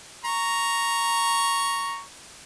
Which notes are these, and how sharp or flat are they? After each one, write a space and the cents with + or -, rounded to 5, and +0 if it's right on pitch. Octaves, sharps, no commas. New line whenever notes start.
A#5 +0 C#6 +0